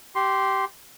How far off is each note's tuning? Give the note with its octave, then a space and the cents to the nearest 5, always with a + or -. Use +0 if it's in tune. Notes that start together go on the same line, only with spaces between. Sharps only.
G4 -15 C6 +0